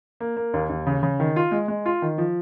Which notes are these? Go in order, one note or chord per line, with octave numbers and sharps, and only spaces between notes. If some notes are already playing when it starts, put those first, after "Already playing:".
A#3
A#3
D#2
D#2
C#3
C#3
D#3
F4
G#3
G#3
F4
D#3
F3